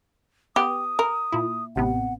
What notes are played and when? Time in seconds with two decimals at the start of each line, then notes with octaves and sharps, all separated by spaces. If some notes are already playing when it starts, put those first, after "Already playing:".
0.56 B3 G4 D#6
0.99 A#4
1.32 A#2 E4
1.76 A1 C3 B3 F#5